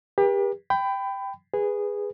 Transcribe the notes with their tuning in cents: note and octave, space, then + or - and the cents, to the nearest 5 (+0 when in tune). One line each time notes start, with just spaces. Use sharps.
G4 +30 B4 -45
G5 +0 B5 +25
G#4 -15 B4 +0